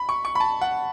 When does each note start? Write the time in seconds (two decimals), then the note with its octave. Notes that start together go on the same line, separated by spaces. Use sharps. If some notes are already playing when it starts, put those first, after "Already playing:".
Already playing: B5
0.09 C#6
0.25 C#6
0.35 B5
0.40 A5
0.61 F#5